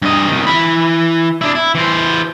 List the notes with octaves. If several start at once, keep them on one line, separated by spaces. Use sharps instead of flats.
G2 D#5
C2 D#3
E3 B5
D4 E4
E4
E3 C5